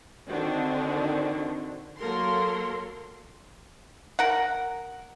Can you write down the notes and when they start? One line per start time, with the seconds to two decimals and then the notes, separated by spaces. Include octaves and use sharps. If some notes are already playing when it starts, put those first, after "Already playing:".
0.28 D3 D#3 C4 D4 F#4
1.99 F#3 A#3 A4 A#4 C6
4.19 A#4 F#5